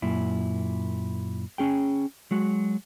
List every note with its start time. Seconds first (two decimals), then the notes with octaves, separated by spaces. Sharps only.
0.02 F#2 A#2 E4
1.58 C#4 G#4 G5
2.31 F#3 G#3 F#4